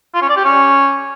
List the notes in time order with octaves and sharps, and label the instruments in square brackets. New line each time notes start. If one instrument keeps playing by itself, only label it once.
[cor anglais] F4
C#4
D5
G4
C#4